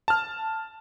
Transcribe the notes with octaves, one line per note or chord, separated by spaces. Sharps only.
A5 F6